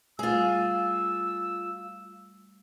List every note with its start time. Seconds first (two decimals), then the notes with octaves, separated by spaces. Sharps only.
0.19 G3 A3 F4 G#4 E6